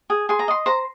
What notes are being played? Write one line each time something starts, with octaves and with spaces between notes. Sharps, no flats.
G#4
G#4 C6
A#5
D#5 C6
C5 A#5